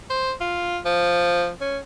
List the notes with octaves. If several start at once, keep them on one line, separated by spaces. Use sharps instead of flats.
C5
F4
F3
C#4